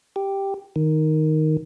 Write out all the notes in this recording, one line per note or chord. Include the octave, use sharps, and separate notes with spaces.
G4
D#3